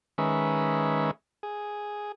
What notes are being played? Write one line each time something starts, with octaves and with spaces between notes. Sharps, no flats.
D#3 G#3 C#4 B4 E5
G#4